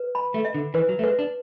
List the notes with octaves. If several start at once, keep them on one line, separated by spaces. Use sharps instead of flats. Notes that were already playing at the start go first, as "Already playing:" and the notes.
Already playing: B4
B5
A3
E5
D3
E3 B4
F#3
A3
G#3 B4
D4